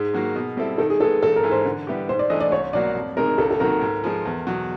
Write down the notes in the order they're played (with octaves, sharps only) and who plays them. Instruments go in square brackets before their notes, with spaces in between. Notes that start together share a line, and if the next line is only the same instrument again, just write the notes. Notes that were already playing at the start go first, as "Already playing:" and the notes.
Already playing: [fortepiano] G#2 [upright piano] G#4
[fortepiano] D#3 F#3 A#3
B2
G3 C4 E4 A4
[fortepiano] D#3 [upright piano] A4
[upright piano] G#4
[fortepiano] G#3 B3 [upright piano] A4
[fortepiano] A1 [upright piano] A4
[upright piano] A#4
[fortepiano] G#2 E3
[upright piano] C5
[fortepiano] D3
G3 B3 E4 G4
[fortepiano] G#2 [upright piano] C5
[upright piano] D5
[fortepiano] E3 A3 D4 [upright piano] D#5
[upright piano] D5
[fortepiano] C2 [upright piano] C#5
[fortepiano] B2 F#3 A#3 [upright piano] D5
[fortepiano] F2
[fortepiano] C3 D#3 G#3 [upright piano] A#4
[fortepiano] C#2 [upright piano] A4
[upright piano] A4
[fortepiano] C3 D#3 F#3 A#3 [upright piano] A#4
[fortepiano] G#2
F3 G#3
E2
B2 F#3